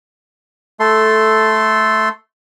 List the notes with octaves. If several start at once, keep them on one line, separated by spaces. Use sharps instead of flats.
A3 A4 C6